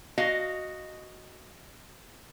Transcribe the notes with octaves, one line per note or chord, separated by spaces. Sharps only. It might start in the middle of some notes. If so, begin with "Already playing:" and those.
F#4 D#5 F5